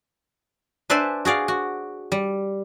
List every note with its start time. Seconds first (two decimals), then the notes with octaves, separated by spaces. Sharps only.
0.90 D4 B4 C5 D5 E5 G#5
1.25 F#4 G#4 D5 F5
1.48 F#4
2.12 G3